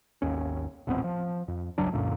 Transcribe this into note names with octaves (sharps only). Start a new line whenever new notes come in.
G#1 D#2 C#4
D#1 A1 B3 C4
F3
F2
G1 C#2 F#3 D4
C#2 F#2 A#2 D3